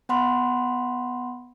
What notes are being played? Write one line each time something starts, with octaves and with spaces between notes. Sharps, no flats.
B3 F#5 B5 C6